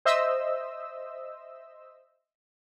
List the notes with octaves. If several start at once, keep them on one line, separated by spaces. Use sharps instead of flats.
C5 D#5 E5 E6